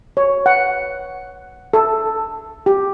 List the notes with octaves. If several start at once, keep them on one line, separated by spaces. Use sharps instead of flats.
C#5
F#5
A4
G4